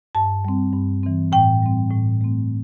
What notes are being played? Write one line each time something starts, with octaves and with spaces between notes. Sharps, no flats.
G2 A5
G3 C4
G2
E3 C4
A2 G5
G3 C4
A2
A3 C4